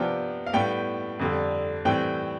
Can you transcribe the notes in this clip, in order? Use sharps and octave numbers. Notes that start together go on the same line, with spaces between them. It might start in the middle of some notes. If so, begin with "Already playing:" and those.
Already playing: C3 F3 B3 D4 G5
F5
A2 G3 B3 G5
F2 D3 G3
A2 E3 G3 C4 G5